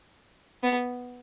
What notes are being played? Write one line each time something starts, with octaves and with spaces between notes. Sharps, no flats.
B3